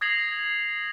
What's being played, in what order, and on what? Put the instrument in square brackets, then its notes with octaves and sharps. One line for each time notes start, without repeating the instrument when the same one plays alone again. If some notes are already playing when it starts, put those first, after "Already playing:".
[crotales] D#6 G#6 A#6 C7 F7 F#7